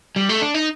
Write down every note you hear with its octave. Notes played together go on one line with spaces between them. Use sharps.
G3
A3
D4
D#4